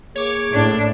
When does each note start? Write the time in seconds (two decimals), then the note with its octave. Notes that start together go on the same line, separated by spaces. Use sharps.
0.16 A#3 G#4 C#5 D6
0.54 A2 D4